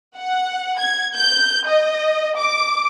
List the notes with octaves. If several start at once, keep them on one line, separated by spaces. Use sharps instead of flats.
F#5
G#6
G6
D#5
D6